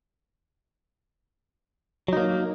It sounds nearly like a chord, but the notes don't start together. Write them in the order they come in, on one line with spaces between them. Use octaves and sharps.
F#3 D#4 A#3